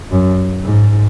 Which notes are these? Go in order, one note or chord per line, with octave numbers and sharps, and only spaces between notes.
F#2
G#2